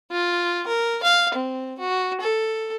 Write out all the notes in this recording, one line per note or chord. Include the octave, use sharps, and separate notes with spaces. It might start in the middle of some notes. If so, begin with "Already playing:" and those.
F4
A#4
F5
C4
F#4
A4